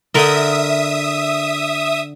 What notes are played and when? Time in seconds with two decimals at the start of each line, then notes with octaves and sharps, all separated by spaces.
0.14 D3 A#4 D#5 E5 D#6